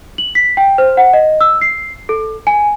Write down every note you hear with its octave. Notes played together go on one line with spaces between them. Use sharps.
F#7
B6
G5
C5
F#5
D#5
E6
C7
A4
G#5